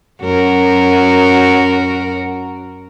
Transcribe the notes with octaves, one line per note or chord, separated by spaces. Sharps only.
F#2 F#4 A#4